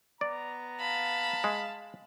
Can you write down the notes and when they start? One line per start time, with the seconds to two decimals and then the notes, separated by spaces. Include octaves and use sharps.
0.21 B3 D5 A#5
0.80 F5 A5 B5
1.44 G#3